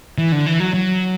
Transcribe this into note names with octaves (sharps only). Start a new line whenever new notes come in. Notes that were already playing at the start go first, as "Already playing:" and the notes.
E3
D3
E3
F#3
F#3